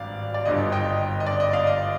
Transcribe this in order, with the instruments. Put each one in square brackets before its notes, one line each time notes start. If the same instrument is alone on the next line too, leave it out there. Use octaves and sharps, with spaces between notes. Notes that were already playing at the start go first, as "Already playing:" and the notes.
Already playing: [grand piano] G#1 G2 D5 F5
D5
G1 G2 D3 D#5
D#5 G5
D#5
D5
D#5
D5 F5
D#5